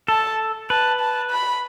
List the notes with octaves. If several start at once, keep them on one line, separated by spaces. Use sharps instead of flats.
A4 A5
B4 A5
A5
B5